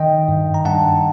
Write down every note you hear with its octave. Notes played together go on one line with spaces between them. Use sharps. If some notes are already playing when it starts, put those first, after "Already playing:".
Already playing: D#3 D#5 G5
G2
A#5
G2 F#5 A5